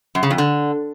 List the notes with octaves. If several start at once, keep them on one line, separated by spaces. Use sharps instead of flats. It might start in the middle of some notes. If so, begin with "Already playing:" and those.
F#2
C#3
F2
D3